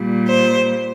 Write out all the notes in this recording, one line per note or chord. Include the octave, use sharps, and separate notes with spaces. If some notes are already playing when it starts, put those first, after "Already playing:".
Already playing: A#2 G3
C5